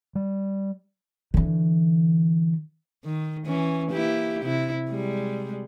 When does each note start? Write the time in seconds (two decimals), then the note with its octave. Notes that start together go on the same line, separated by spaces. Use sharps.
0.15 G3
1.34 D3 E3
3.05 D#3
3.46 E3 C#4
3.91 A#3 E4 G4
4.43 C3 E4
4.90 G3 G#3